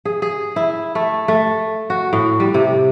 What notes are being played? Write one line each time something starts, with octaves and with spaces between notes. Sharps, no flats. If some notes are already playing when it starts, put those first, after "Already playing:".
G#4
G#4
E4
A3
A3
F#4
A2
G3
C3